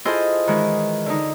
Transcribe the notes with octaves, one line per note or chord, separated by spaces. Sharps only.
E4 F4 G#4 A4 C5 D#5
D#3 E3 G#3
D3 D#4